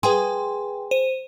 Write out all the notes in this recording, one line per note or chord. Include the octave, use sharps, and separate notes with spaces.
G#4 B4 G5 C6
C5 D#7